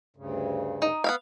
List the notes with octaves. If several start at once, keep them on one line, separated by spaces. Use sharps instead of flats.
D2 G2 C#3
D#4
B3 E5 F5